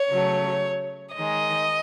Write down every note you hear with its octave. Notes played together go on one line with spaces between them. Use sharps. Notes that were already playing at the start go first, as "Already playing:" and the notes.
Already playing: C#5
C#3 F#3 A3
D#3 G#3 D#5